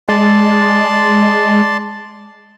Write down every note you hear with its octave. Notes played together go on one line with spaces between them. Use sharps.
G#3 D5 A5 C6